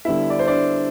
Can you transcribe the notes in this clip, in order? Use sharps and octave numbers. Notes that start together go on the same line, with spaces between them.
D3 G3 B3 E4 E5
D5
C5
D4 D5